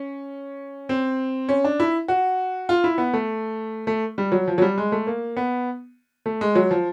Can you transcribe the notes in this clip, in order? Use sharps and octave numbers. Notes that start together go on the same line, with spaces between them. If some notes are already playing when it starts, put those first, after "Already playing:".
Already playing: C#4
C4
C#4
D4
E4
F#4
F4
E4
B3
A3
A3
G3
F#3
F3
F#3
G3
G#3
A3
A#3
B3
A3
G#3
F#3
F3